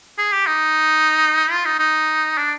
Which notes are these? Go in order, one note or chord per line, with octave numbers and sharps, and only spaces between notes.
G#4
G4
D#4
F4
D#4
D#4
D4